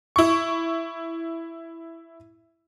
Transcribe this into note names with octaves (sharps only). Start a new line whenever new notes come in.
E4 C#6